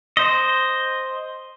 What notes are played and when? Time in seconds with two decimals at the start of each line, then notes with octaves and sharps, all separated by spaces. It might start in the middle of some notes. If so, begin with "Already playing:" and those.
0.17 C5 D#5